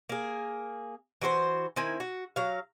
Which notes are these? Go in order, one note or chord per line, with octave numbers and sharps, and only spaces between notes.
A#3 G#4
E3 F#4 G4 C5
D#3 C4 E4 G#5
F#4
F#3 F5